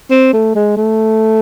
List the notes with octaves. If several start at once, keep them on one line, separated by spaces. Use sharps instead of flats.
C4
A3
G#3
A3